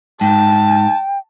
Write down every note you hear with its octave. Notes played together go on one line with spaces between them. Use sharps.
G#2 G5 A5